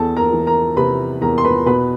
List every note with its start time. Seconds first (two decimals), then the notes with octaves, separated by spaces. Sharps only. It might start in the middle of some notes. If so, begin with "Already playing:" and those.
Already playing: E2 A4 A5
0.17 A#4 A#5
0.32 E3
0.46 A#4 A#5
0.76 C3 B4 B5
1.21 E2 A#4 A#5
1.38 C6
1.45 B4 B5
1.66 B2 B4 B5